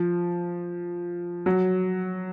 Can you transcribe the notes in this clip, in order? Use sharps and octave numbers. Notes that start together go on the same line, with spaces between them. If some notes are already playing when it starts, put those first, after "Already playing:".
Already playing: F3
F#3